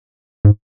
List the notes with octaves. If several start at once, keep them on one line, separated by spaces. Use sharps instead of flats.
G#2